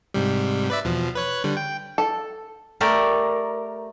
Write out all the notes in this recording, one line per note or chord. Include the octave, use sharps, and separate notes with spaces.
G#2 C3 G3
B4 D5 E5
E2 B2 F3
B4 C#5 F#6
D3 G3
G5
A4
A3 G4 A#4 D5